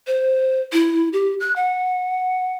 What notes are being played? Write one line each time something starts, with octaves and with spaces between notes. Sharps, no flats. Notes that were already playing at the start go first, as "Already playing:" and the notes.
C5
E4
G4
F#6
F#5